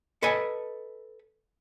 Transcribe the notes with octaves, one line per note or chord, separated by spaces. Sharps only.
A4 B4 D#5 G#5